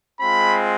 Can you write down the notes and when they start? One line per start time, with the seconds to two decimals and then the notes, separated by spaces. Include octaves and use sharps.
0.20 G#3 C4 F4 B5